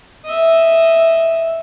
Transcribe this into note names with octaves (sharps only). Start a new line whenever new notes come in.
D#5 E5